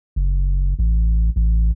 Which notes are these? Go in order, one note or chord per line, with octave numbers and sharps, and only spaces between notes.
F#1
A1
A1